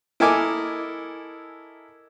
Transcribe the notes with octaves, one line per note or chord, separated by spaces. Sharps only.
E4 A4 A#4 D#5 G#5 D6